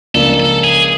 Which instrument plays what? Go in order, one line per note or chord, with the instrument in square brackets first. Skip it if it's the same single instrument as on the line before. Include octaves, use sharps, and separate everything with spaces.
[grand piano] C#2 C#3 F3 A#3 D4 [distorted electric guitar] A4
[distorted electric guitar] A4
G#4